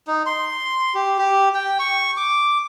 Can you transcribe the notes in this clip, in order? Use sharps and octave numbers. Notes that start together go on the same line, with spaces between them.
D#4
C6
G4
G4
G5
C#6
D6